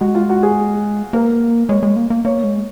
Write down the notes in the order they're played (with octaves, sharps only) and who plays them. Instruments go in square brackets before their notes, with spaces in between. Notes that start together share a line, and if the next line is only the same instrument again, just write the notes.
[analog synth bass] G#3 [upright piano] F#4
[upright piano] F4
F#4
G#4
[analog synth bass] A#3 [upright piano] A#4
[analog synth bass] G#3 [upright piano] C#5
[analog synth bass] G#3
A#3
A#3
[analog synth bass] A#3 [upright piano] C#5
[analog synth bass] G#3